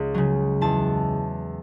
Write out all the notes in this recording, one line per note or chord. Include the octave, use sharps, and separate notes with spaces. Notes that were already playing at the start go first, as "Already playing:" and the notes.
Already playing: C#2
C#3 F#3
E2 A5